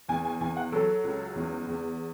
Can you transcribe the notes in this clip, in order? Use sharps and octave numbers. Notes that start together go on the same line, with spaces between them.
E2 G#5
G#5
E2 G#5
F#5
F#3 A4
C#2
E2
E2